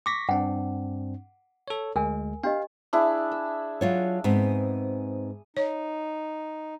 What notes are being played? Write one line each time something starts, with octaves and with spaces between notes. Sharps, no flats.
C#6 D6 A#6 B6
G2 C4 D4 F#5
A4 C#5
D2 G#3 A#4 G#5
D4 G4 D#5 F5
D4 E4 G#4
E6
F#3 F4 C#5
G#2 B3 C4 D#6
D#4 C#5